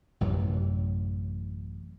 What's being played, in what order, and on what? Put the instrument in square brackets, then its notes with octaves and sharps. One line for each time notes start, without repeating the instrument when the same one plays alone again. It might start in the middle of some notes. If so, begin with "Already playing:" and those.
[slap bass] A1 F#2 C3 E3